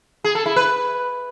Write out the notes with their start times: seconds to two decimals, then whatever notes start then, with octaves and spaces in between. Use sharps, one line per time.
0.24 G#4
0.35 A4
0.46 E4
0.56 B4